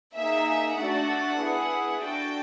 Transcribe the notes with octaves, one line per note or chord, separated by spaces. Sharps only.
A#3 D#4 G#4 E5
A3 D4 F#4 A4 F#5
B3 E4 G#4
D4 F#4 A4 G5